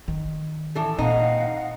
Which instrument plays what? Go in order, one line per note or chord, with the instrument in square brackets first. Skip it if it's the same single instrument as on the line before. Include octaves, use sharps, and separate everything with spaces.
[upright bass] D#3
[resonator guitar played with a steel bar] A2 E3 A4
[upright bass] A#2 [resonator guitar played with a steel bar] C4 D#4 [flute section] D#5 F5 F#5